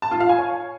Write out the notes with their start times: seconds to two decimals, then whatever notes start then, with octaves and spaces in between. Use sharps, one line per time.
0.02 A5
0.11 F4
0.20 F5
0.29 G#5
0.38 C#5